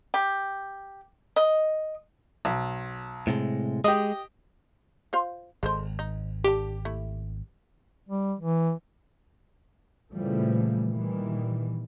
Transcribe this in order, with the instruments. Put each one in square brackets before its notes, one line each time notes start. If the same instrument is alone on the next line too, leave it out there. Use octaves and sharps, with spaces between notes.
[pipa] G4
D#5
[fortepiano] B1
[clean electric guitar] A2 C3 G#3
[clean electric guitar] G#3 [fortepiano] G4 D#5
[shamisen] F4 C5 F5
[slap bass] G#1 [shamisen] G#3 A4 C5
[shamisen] D#4
[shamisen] D3 A5 [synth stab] G4
[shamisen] A3 E4
[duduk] G3
E3
[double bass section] A#2 C#3 E3 F3 G3 A3
A#2 D#3 E3 G3